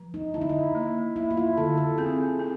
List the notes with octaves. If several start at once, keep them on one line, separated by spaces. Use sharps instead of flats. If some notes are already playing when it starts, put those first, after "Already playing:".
Already playing: F3
D#4
D3 E4
D#4
E4
A#3
A#3 E4
F4
E4
D3 A4
A4
C4 G#4
C4